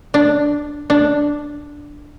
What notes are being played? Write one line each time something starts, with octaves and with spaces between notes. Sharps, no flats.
D4
D4